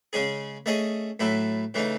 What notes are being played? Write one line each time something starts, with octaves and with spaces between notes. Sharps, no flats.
C#3 G#3 C#4 G#4
A3 C#4 G#4 D#5
A2 F#3 A3 E4
C#3 E3 A3 D#4